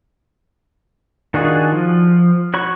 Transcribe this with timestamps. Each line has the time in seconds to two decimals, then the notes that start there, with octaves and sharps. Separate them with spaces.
1.34 D#3 D4 F4 F#4 G#4
1.72 F3
2.54 F#4 C#5 B5 C#6